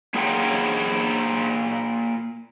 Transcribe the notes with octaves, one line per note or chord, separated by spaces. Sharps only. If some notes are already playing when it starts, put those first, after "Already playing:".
A#3 F4 G#4 A#4 F#5 G5